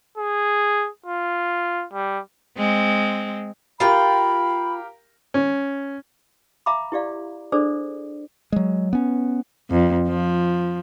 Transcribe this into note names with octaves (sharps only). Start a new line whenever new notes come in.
G#4
F4
G3
G#3 C4
F4 G4 A#4 F5 G5 B5
C#4
E5 F5 A#5 B5 D6
E4 G4 D5 F5
D4 G#4 A4 C5 D5
F#3 G#3
B3 C#4
F2
F3